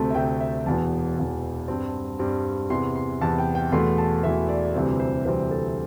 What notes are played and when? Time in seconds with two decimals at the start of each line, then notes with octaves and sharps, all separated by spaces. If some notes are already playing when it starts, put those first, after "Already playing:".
Already playing: D2 C3 A3 C4 A5
0.10 E5
0.15 D2 C3 A3 C4 G5
0.40 E5
0.66 E1 E2 E3 A5
1.17 E1 E2 E3
1.68 G2 G3 C4
2.19 G2 G3 C4
2.70 E2 C3 E3 C6
2.96 C6
3.21 E2 C3 E3 A5
3.38 G5
3.55 G5
3.72 E1 E2 E3 A3 C6
3.98 A5
4.23 E1 E2 E3 A3 E5
4.49 D5
4.74 D2 C3 E3 G3 C4
5.00 C5
5.25 D2 C3 E3 G3 C4 C5
5.51 A4